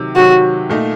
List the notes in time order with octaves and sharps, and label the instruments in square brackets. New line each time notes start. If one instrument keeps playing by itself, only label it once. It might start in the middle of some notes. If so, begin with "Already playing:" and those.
Already playing: [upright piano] C3 D#3 F#3
[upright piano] C3 D#3 F#3 [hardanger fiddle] F#4
[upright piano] A#2 A3 D#4